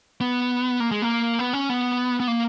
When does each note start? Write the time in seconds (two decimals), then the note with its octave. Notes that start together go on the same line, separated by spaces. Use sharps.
0.21 B3
0.80 A#3
0.91 G#3
1.02 A#3
1.39 B3
1.53 C#4
1.69 B3
2.20 B3
2.28 A#3